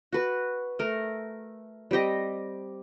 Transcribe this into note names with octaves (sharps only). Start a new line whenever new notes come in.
F#4 B4
A3 A#4
G3 C4 G4 D#5